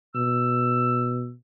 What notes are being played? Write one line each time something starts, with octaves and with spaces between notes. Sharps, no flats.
B2 E6